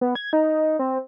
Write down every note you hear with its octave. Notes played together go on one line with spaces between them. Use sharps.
B3
G#6
D#4
C4